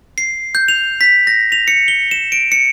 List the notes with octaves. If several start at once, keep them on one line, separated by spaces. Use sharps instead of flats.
C7
G6
F7
B6
A#6
F7
C#7
G7
E7
D7
C#7